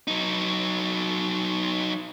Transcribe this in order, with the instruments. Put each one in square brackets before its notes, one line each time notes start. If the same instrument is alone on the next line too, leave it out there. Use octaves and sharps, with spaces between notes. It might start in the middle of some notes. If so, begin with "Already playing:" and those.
[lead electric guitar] F#3 D#4